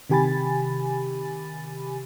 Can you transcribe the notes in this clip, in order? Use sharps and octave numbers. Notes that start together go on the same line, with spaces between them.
C3 D#3 G4 G#5 B5 A6